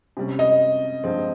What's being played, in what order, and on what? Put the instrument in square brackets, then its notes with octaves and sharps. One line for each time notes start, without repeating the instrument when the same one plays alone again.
[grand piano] C3 G3 C#4
[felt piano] D#5
[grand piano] G2 F3 G#3 C4